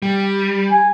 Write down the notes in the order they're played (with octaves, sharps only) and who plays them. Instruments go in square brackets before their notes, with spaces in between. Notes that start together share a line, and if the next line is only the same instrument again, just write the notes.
[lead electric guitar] G3
[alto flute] G#5